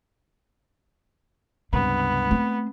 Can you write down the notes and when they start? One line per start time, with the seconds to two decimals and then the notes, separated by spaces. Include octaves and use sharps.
1.73 C#2 G2 C3 B3
2.31 A3 C4